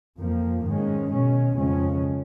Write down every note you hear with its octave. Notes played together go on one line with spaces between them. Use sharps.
F2 F3 A#3
G#2 D#3 G#3 C#4
B2 G#3 C#4
F2 C#3 G#3 C#4